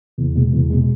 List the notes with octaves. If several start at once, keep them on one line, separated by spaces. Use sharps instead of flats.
E2
B2 G#3
E2
B2 G#3